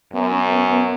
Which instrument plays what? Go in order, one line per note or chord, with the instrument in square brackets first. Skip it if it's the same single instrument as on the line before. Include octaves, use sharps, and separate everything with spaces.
[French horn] F#2 [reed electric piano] B3
[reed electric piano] C#4
B3
B3